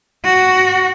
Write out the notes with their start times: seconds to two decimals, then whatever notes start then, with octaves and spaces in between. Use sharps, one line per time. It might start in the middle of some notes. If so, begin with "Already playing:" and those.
0.24 F#4